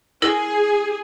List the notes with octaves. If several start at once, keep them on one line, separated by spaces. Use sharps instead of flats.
E4 G#4 A#4